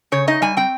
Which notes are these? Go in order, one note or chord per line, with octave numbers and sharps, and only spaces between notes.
C#3 C#5
D#4 D#5
G3 G#5
C4 G5